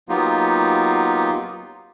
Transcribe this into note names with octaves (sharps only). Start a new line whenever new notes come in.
F#3 A#3 B3 D#4 F4 G4